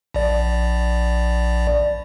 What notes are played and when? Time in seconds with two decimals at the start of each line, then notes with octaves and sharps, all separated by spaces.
0.14 A#1 D5